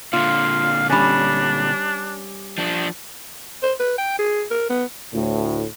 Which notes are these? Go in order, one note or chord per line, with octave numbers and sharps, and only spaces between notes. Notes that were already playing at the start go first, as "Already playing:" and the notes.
A#2 D3 F4 F5
G3 C#4 D4
F3 D4
C5
B4
G5
G#4
A#4
B3
D2 A2